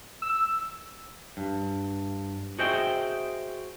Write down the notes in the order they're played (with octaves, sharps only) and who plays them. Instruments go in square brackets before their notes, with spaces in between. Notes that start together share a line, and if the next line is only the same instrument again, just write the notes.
[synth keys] E6
[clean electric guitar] G2
F#4 G#4 C5 D#5 E5 G5